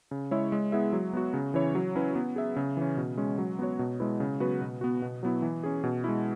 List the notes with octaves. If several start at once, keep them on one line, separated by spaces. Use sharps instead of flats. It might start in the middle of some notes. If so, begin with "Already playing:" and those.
C#3
G#3 E4 C#5 E5
G#3
B3 E4 G#4 E5
F#3
B3 F#4
C#3
E3 C#4 E4 C#5
F#3
C#4 E4 B4
B3
G#4 E5
C#3
E3 C#4
B2
G#3 C#4
F#3
B3 F#4 C#5
B2
G#3 E4 B4
C#3
F#3 B3 F#4 B4
B2
B3 F#4
B2
F#3 B3 E4
E3
C#4 G#4
B2
G#3 E4